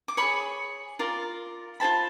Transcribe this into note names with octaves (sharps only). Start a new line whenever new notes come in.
D6
G#4 C#5 B5 C#6
F4 A#4 D5
F4 G#4 C5 A5 B5